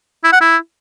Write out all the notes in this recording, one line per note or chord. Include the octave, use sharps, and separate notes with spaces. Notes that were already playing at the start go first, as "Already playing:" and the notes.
E4
F#5
E4